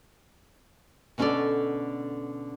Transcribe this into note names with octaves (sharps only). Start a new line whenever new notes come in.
B2 D3 C#4 G#4 A4 D5